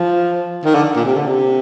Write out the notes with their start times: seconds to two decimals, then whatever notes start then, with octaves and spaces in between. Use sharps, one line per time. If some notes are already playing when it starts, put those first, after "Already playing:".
Already playing: F3
0.64 D#3
0.75 D3
0.96 A#2
1.05 C3
1.16 D3
1.26 C3